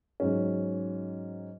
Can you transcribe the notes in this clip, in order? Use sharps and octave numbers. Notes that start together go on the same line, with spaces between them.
G#2 F#3 C#4